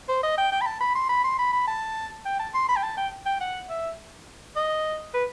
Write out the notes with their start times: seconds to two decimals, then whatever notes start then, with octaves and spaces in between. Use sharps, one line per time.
0.09 C5
0.23 D#5
0.38 G5
0.52 G5
0.61 B5
0.67 A5
0.81 B5
0.95 C6
1.09 B5
1.24 C6
1.39 B5
1.53 B5
1.68 A5
2.26 G5
2.39 A5
2.54 C6
2.69 B5
2.77 G5
2.83 A5
2.98 G5
3.26 G5
3.41 F#5
3.69 E5
4.56 D#5
5.14 B4